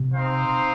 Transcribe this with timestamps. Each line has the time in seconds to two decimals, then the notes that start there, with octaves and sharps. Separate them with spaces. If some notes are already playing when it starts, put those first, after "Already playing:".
Already playing: C3
0.14 C4 D#4 C5 F5